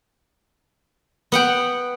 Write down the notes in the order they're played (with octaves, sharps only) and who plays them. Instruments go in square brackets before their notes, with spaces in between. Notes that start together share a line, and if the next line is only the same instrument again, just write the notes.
[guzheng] B3 F#5 G5